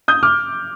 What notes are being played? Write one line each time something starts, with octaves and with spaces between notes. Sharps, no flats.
D#6 G6
D6 F6